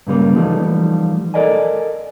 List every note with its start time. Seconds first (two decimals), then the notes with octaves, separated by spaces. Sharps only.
0.07 G2 C#3 G3 A#3
0.36 E3 F3 G3 A3 D#4
1.34 A4 A#4 D5 D#5 G#5